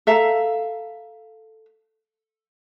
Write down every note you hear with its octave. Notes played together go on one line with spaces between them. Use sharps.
A4 E5 F5 A#5